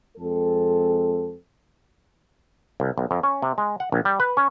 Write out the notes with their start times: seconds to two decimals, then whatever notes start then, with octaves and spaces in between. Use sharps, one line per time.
0.16 F2 G#3 C4 A4
2.80 C2
2.98 B1
3.11 F2
3.23 C#4
3.42 C3
3.58 G#3
3.80 F#5
3.92 A#1
4.05 G3
4.20 B4
4.37 C#4